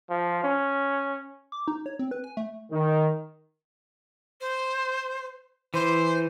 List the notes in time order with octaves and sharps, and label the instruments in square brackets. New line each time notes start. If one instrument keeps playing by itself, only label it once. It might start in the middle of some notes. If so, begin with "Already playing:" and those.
[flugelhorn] F3
C#4
[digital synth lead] D6
D#4
C#5
C4
B4
G#5
A3
[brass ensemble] D#3
[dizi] C5
[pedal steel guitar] E3 [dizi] C5